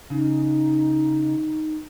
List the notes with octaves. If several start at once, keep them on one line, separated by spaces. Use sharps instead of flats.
C#3 D#4